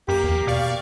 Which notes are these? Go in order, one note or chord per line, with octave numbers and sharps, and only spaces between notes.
F#2 A#3 G4
E2
B2 D5 F5 C#6